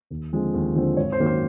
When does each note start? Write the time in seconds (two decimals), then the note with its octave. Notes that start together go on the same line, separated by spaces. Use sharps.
0.10 D#2
0.33 D3 F3 G#3 C4
0.54 D#2
0.75 D3 F3 G#3 C4
0.97 G#1 C#5
1.12 C5
1.20 F#2 D#3 F#3 A#3
1.26 C5